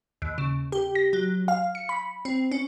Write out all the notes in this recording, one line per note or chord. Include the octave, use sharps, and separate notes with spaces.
D#2
C#3
G4
A#6
F#3
F5
C#7
B5
C4
C#4